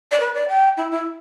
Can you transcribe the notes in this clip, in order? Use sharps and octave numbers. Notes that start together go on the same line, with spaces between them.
D5
B4
D5
G5
E4
E4